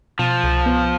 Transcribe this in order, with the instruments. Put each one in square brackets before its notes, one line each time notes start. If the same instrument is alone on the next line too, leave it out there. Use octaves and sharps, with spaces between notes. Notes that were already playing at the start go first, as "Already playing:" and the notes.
[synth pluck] B2 [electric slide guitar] F3
[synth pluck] C2
B3